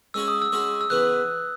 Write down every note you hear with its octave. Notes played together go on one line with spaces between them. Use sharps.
G#3 C#4 F#4 C#5 E6
D#6
E6
G#3 C#4 F#4 C#5
E6
C#3 E3 B3 F#6